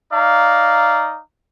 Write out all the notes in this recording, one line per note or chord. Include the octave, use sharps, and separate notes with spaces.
D#4 D5 F5 A#5